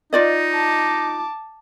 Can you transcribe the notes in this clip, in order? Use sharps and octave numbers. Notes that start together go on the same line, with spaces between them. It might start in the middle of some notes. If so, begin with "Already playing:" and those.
D#4 F4 D5 D#5
A5 D6